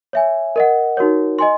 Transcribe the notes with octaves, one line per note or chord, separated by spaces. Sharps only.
C#5 E5 G#5
A#4 D#5 F#5
D#4 F#4 A#4 C#5
D#5 G#5 C6